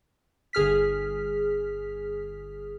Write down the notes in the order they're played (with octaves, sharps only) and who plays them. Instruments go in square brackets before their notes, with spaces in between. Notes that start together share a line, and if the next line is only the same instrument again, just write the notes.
[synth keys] G1 G#4 F6 B6